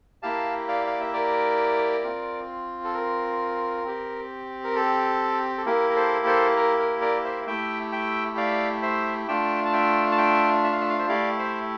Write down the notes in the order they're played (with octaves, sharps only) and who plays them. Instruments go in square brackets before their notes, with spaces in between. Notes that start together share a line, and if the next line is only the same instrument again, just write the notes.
[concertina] A#3 E4 G4 F5 A5
D5 F5
F5
E5
A#4 D5
C4 F4
A4
A#4
C4 G4
A#4
A4
A4
A#3 E4 G4 A#4
A#4
A4 C5
A4 C5
A#4
A#4
A#4 D5
C5 E5
A3 E4 G4 E5 G5
E5 G5
D5 F5
C5 E5
A3 D4 F4 E5 G5
A5
E5 G5
A5
E5 G5
E5
F5
E5
F5
C5 E5
A3 E4 G4 D5 F5
C5 E5